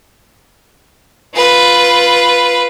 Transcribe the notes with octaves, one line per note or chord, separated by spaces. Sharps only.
F4 B4